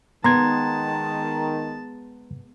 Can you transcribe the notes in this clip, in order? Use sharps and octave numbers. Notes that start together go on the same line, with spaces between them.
D#3 G#3 B3 A5 A#5 C6 G#6